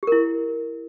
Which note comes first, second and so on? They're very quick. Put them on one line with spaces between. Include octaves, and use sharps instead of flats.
G4 A#4 E4